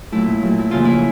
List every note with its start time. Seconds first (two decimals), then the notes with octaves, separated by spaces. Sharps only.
0.12 A#2 F#3 A3 E4
0.41 A#2 F#3 A3
0.59 E4
0.70 F2 C#3 E3 G3 A#3 F4
0.85 E4